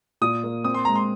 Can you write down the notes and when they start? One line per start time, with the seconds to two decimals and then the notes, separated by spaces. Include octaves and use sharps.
0.21 A#2 D#6
0.44 A#3
0.64 C4 D#6
0.74 C6
0.85 G#3 A#5
0.95 C6